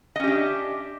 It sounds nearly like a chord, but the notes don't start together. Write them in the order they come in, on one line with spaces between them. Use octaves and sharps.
D#5 C#4 G4 D4 E5